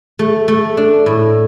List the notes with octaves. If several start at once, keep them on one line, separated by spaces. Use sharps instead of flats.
A3
A3
D4
A2